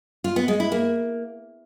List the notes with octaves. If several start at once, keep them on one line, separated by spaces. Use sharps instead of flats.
F4
B3
G#3
E4
A#3